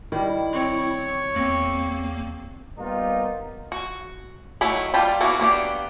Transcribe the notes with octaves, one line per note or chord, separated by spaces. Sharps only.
D#3 G3 E4
C4 C#5
E2 A#3 C4
G3 A#3 B3 D#4 F4 G4
F#4
D#3 F#3 A3 E4 B5
G3 F4 G5 A5 B5
A#3 B3 E4 F#4
A#3 B3 D4 G4